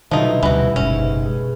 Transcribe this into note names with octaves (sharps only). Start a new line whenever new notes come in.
C2 B2 D3 F3 F#3 D#4 E4
D2 C3 E3 G3 F#4
F#1 G#2 C#4
B3 G#4